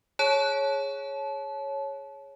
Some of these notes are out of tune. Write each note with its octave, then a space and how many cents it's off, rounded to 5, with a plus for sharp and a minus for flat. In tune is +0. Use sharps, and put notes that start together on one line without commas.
G#4 +0 C#5 -5 A5 -30